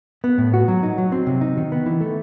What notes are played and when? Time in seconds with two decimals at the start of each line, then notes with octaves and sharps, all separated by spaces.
0.24 B3
0.38 A2
0.54 F#4
0.68 F#3
0.83 D#4
0.98 F#3
1.12 C4
1.27 C3
1.41 D#4
1.57 D#3
1.72 B3
1.86 E3
2.01 A3